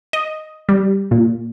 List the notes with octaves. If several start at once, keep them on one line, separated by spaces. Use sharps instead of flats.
D#5
G3
A#2